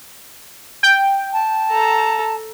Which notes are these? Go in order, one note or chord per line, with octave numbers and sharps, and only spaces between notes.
G5
A5
A4 A#5